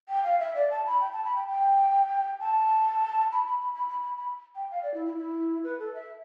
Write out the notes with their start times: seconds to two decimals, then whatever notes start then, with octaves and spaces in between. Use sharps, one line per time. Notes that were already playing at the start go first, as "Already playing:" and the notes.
0.09 G5
0.24 F5
0.40 E5
0.55 D5
0.70 A5
0.86 B5
1.01 G5
1.13 A5
1.24 B5
1.36 G5
1.47 G5
2.40 A5
3.32 B5
3.47 B5
3.61 B5
3.75 B5
3.89 B5
4.03 B5
4.18 B5
4.55 G5
4.71 F5
4.83 D5
4.94 E4
5.06 E4
5.17 E4
5.64 B4
5.79 A4
5.94 E5